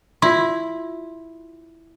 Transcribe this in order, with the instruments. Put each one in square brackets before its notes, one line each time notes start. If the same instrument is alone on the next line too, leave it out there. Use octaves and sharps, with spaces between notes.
[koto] E4 [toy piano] F4 C6